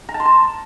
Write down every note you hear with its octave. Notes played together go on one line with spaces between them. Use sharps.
A#5
A5
C6
A5